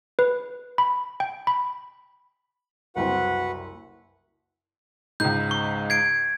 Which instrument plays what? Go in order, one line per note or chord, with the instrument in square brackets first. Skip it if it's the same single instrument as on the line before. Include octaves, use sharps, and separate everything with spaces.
[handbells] B4
B5
G5
B5
[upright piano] F#1 C2 C4 [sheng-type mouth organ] F#4 B4 F#5
[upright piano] C#2 G#2 [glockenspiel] G6
[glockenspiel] C#6
G#6 C7 D7